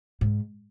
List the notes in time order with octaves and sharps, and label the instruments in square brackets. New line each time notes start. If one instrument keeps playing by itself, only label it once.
[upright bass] G#2